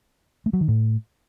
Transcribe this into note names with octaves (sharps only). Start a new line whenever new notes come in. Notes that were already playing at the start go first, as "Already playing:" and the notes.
A3
F#3
D#3
A2